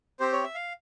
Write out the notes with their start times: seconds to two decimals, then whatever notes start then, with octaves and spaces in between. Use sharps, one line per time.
0.20 C4 G4 C5
0.32 C#5
0.44 E5
0.55 F5